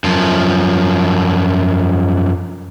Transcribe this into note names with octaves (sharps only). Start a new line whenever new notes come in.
F#2 F3